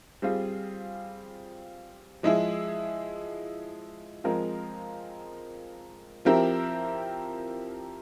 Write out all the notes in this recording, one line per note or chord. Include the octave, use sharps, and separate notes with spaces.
G3 C4 F4 G#4
F3 G#3 E4 G#4
F3 G#3 C4 F4 A#4
F3 C4 E4 G4 A#4